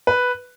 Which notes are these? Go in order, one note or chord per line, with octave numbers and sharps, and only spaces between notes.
B4